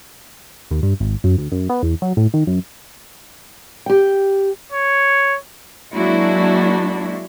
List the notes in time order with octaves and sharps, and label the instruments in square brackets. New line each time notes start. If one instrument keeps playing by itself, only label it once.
[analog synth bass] D#2
G2
G#1
F#2
D2
F#2
B3
E2
F#3
A2
D#3
F#2
[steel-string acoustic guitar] G4 G5
[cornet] C#5
[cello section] F#3 G#3 A#3 D4 E4 F#4